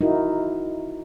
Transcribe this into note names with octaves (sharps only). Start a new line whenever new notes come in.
D#4 E4 F#4 A#4